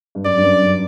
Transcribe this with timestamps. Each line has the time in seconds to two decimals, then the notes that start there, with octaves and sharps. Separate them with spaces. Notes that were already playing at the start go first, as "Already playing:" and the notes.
0.15 G2
0.25 F#2 D5
0.37 G2
0.43 F#2
0.62 F#2